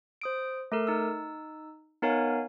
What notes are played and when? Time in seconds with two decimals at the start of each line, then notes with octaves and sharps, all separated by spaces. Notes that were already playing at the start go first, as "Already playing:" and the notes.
0.21 C5 D#6 D7
0.72 A3 A4 A#4
0.87 D#4 E6
2.02 B3 D#4 A#4 C#5 F5 G#5